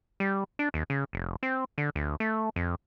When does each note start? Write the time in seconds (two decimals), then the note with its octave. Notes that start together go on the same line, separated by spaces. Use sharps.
0.20 G3
0.59 D4
0.74 D#2
0.90 C#3
1.13 F1
1.43 C4
1.78 D3
1.96 D2
2.20 A3
2.56 F2